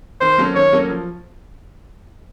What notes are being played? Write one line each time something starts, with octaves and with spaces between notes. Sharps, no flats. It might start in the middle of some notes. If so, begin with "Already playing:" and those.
D#3 C5
F#3 A#3 C#4 A4
D#3 C#5
F#3 A#3 C#4 A4
F3